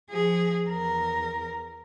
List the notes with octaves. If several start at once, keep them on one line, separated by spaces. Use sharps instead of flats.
F3 G#4
E2 A#4